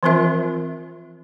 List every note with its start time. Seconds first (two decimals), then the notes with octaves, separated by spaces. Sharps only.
0.03 E3 F3 C4 F4 A#4 E5